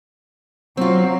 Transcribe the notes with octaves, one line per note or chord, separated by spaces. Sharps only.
F#3 C4 F4